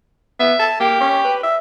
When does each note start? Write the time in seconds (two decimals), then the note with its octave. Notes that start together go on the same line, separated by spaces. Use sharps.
0.40 B3 E5
0.59 A5
0.80 A#3 G4
1.01 C#4
1.25 B4
1.43 E5